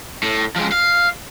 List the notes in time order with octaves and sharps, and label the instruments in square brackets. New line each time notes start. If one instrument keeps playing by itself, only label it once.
[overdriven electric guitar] A2
F3 G#3
F5